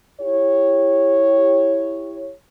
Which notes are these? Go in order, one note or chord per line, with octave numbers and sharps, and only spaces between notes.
E4 G4 C#5